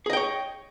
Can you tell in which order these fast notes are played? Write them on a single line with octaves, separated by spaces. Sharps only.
G#4 D#5 G5 C#5